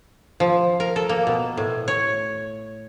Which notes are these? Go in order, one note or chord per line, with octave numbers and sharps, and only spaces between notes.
F3
A#4
A4
A#3
B2
A2
C#5